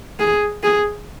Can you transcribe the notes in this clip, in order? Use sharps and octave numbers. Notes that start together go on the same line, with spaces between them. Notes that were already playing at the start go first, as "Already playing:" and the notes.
G#4
G#4